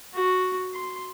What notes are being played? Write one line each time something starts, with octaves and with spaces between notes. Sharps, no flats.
F#4
C6